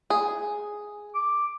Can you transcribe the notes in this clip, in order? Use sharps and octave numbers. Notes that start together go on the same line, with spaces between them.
G#4
D6